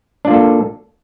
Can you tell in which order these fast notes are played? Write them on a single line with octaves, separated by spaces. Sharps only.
D4 F4 A#3 A4